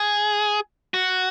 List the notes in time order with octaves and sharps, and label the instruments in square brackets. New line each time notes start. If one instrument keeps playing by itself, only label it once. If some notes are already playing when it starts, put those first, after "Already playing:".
Already playing: [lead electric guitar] G#4
F#4